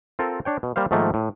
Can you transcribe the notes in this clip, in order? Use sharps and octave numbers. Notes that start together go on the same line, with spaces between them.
C4 F4 A4 A#4
D4 C#5 G5
B2
G3 A#3 C5 F5
G#2 D#3 F3 A3 A#3
A2